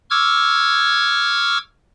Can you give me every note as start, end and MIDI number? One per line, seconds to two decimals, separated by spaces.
0.10 1.58 85
0.10 1.58 86
0.10 1.58 88
0.10 1.58 89
0.10 1.58 92